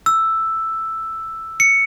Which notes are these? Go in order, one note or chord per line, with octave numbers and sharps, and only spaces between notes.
E6
C#7